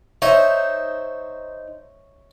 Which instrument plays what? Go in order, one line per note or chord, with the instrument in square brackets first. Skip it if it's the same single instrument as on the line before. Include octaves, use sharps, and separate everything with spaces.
[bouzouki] D#4 C5 [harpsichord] C#5 D#5 E5